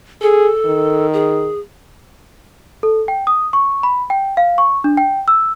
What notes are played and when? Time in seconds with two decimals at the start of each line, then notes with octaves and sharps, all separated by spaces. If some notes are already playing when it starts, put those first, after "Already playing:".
0.22 G#4 A4
0.66 D#3
1.13 G#4
2.83 A4
3.08 G5
3.27 D#6
3.53 C#6
3.83 B5
4.10 G5
4.37 F5
4.58 C#6
4.84 D4
4.97 G5
5.28 E6